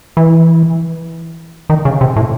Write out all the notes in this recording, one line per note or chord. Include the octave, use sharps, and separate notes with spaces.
E3
D#3
C#3
C3
A2